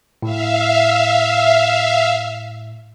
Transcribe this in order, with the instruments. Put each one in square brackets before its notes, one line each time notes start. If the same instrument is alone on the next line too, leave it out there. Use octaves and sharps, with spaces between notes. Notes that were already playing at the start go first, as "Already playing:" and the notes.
[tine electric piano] A2 [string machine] E5 F5